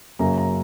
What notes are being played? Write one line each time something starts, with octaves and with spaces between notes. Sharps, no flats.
F#2 C#3 F#3 A#3 A#5
A#5